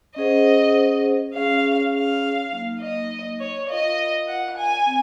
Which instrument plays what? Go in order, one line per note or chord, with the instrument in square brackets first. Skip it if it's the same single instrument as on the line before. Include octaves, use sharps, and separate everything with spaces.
[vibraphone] C#4 G#4 C5 F#5 [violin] D#5
[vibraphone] C#4 G#4 C#5 [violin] F5
[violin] F5
[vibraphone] F#3 A#3 D#4
[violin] D#5
C#5
[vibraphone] F4 A#4 F5 [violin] D#5
[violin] F#5
G#5
[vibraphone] C4